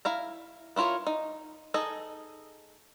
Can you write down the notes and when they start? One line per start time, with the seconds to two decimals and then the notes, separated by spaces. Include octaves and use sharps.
0.05 E4 F5 A#5
0.76 B3 E4 F4 A#4 C#5
1.07 D#4
1.74 D#4 G#4 A4 D#5